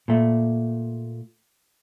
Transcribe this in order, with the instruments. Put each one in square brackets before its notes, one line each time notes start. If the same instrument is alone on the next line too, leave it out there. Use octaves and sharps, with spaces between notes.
[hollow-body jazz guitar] A#2 A3